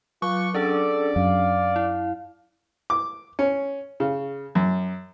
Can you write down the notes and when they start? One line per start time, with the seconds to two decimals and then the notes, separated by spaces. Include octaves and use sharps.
0.22 F#3 F4 C#6 D6 F#6
0.54 C#4 D4 G#4 A4 D5
1.16 F#2 F5
1.76 E4
2.90 D6
3.39 C#4
4.00 C#3
4.55 F#2